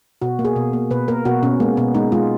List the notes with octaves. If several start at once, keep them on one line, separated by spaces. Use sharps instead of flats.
B2 F#4
A#3
G#4
B2
A#3
B2 B4
A#3 A#4
B2 F#4
B2 C#4
G#3 A#3
B2 B3
G#3 D#4
G#3 F4